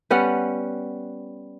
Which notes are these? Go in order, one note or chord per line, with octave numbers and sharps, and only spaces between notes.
G3 B3 C#4 F#5